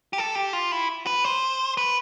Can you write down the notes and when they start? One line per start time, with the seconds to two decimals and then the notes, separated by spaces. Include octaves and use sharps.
0.13 G4
0.18 A4
0.35 G4
0.53 F4
0.72 E4
1.07 B4
1.24 C5
1.77 B4